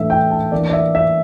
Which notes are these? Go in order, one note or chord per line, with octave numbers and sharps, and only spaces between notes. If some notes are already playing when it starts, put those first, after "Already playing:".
Already playing: A2 E3 A3 D4 E5
G5
A5
E3 A#3 D4 D5
D5
E5
E5